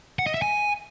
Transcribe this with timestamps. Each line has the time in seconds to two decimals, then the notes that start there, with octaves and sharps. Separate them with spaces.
0.19 F#5
0.27 D#5
0.34 E5
0.42 G#5